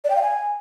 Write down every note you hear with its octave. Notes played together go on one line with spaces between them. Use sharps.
D5
G5
F5
G#5